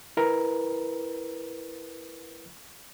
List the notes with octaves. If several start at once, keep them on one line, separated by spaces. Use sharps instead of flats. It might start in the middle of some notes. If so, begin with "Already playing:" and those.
E4 A#4 B4